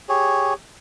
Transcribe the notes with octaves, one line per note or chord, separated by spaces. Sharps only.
G4 G#4 C#5